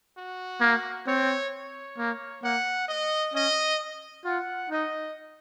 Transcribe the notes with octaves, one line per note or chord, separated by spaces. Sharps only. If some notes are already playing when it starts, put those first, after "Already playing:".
F#4
A#3
C4 C#5
C#5
A#3
A#3 F#5
D#5
C#4 D#5
F4 F#5
D#4 D#5